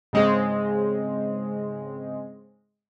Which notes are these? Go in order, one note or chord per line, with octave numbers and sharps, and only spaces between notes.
G#2 C#3 G#3 C4